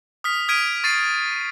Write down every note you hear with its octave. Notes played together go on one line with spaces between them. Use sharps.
D#6 F6 B6
D#6 F6 G#6 B6 D7 D#7
C#6 A6 C7 D#7